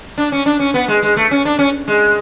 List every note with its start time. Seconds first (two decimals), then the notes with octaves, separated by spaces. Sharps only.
0.18 D4
0.32 C#4
0.46 D4
0.59 C#4
0.74 B3
0.88 G#3
1.03 G#3
1.17 A3
1.31 C#4
1.45 D4
1.59 C#4
1.88 G#3